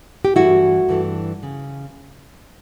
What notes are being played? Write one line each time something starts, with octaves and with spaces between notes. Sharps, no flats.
G4
G2 E3 A3 E4 F#4
G2 E3 A3
C#3